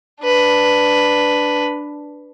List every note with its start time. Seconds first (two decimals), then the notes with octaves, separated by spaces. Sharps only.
0.22 D4 B4